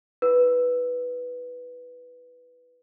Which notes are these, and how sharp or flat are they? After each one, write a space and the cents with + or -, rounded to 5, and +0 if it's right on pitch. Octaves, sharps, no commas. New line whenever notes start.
E4 +0 B4 +0